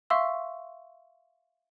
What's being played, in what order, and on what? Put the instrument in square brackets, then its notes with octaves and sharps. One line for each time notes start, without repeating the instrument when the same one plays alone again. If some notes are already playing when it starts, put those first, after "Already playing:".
[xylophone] E5 F5 C6 C#6 E6